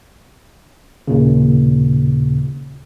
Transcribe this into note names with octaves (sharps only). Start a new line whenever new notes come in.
D#2 A#2 C#3